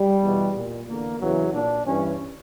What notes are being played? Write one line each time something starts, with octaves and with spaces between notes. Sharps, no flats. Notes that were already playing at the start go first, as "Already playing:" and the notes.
Already playing: G3
E2 B2
A#2
E2 D3 A#3
E2 C#3 E3 F#3
A#2 D4
G2 E3 C#4